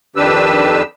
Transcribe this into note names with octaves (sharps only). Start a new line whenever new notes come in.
F2 D#3 D4 G4 B4 E6